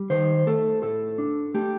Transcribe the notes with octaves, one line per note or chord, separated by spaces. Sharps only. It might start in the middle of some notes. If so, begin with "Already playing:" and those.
Already playing: G3
D#3 C5
A3 A4
A2 A4
D4
A3 G4